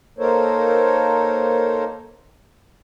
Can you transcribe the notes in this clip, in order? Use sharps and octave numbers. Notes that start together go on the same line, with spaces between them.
A#3 D#4 A4 A#4 C5 C#5